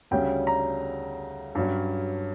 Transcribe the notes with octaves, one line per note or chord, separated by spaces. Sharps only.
D2 C#3 G3 C#4 G5
A#5
G2 F#3 C#4